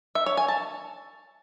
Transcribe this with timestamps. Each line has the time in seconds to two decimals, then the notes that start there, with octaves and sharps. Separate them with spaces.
0.15 E5
0.26 C#5
0.37 G#5
0.48 A5